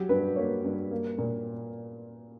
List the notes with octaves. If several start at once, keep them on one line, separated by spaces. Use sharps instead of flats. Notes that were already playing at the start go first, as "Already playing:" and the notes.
Already playing: F#3 G4
G2 B4
A#3 C#5
G2
A#3
A#2